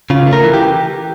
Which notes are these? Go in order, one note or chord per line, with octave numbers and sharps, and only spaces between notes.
C#3 F4
A3
A#4
E3
G4